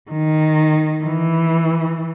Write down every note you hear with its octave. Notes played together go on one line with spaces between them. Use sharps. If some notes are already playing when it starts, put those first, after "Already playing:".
D#3
E3